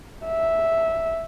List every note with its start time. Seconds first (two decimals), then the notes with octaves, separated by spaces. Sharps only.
0.25 E5